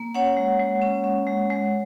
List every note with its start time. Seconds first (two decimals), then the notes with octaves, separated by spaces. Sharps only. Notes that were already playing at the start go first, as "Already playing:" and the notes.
Already playing: A#3
0.15 C#4 C#5 F#5
0.37 G#3
0.59 G#3
0.82 C#4
1.04 C#4
1.27 G#3
1.50 G#3